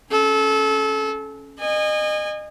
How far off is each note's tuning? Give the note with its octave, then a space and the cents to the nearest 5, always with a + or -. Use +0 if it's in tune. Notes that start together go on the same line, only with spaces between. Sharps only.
C#4 +0 A4 -25
D#5 -30 G#5 -25